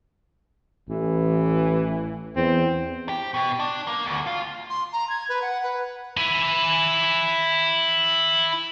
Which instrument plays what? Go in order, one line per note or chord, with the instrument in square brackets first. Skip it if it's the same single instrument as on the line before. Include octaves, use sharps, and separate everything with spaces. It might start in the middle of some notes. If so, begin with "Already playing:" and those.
[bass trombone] A1 [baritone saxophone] E3
[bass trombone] E2 [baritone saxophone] C4
[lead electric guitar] G4
B2
D4
A#3
D2
F4
[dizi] C6
A#5
G#6
B4
F#5
B4
[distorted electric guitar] E4 G#5